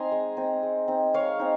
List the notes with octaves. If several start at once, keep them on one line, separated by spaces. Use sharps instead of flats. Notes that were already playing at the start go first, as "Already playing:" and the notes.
Already playing: C4 D#4 G#5 A#5 C6
G#3
C4 D#4
G#3
C4 D#4
G#3 C#5 F5
C4 D#4